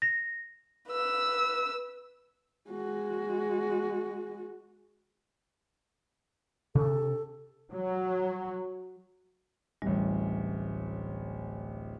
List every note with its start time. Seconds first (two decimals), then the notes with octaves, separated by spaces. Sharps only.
0.02 A#6
0.89 B4 E6
2.70 G#3 F#4
6.75 C3 D4 A4
7.73 F#3
9.82 D1 A1 G3